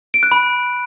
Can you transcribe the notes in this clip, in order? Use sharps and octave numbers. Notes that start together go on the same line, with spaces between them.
D7
F#6
B5